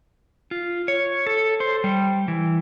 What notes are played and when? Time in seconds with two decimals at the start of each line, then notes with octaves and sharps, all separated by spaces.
0.51 F4
0.88 C#5
1.27 A4
1.60 C5
1.84 G3
2.28 E3